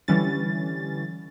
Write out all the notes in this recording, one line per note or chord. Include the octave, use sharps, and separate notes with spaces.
D3 E3 G3 C#4 A6